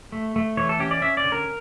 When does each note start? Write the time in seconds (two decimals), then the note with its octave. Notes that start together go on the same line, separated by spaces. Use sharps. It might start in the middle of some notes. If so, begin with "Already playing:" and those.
0.12 A3
0.36 A3
0.57 E3 C#5
0.69 A4
0.80 C#4 G4
0.91 D5
1.02 C#4 E5
1.17 D5
1.24 D3
1.32 A#4